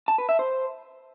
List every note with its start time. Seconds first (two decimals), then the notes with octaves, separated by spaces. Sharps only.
0.08 A5
0.18 B4
0.29 E5
0.39 C5